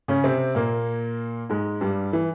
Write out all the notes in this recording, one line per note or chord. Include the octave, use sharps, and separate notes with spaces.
C#3 C#4
C3 C4
A#2 A#3
G#2 G#3
G2 G3
E3